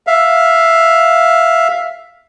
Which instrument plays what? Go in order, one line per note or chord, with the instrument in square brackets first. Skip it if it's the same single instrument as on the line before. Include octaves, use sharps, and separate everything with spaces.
[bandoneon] E5 F5